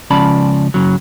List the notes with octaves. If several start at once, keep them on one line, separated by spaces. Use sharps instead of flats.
C#2 F3 C#4 D5 A5 B5
F#2 C#3 F#3